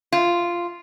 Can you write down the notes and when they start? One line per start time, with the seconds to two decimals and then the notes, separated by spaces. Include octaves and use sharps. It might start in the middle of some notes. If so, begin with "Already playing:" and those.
0.12 F4